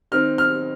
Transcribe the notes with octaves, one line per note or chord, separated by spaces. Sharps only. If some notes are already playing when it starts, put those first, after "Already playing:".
D#3 C4 D#4 F6
F6